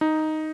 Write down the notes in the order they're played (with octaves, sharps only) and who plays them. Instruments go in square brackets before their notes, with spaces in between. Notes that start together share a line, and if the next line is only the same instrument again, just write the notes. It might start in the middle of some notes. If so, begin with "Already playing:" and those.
[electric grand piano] D#4